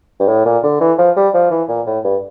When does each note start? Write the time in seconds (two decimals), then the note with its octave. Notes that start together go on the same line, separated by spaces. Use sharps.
0.20 G2
0.28 A2
0.45 A#2
0.63 D3
0.80 E3
0.98 F3
1.16 G3
1.34 F3
1.50 E3
1.69 A#2
1.86 A2
2.04 G2